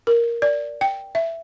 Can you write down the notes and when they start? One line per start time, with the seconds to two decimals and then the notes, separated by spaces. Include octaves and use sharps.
0.07 A#4
0.42 D5
0.81 G5
1.15 E5